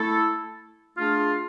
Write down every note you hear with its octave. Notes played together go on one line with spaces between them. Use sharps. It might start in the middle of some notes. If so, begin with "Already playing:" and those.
Already playing: A3 E4 A4
A3 D4 F4 G#4